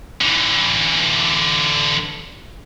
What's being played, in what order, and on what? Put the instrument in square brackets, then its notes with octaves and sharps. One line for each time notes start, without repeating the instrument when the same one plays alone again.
[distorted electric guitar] D3 E3